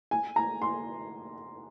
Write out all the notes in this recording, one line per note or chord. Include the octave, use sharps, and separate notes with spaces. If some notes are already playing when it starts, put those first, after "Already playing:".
G#5
A#5
C6